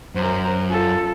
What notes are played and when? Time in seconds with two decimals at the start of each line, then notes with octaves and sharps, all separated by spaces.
0.15 F#2 A#4 C5
0.70 F4 A4